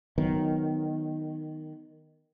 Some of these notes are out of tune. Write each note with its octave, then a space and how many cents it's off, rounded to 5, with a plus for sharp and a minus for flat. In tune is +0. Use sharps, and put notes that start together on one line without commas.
D#3 -5 F#3 +0 B3 +10